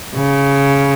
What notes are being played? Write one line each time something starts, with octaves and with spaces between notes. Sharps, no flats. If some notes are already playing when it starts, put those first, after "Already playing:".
C#3